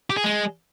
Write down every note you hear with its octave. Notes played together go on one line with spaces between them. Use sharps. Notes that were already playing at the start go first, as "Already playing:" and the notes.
G4
G#4
G#3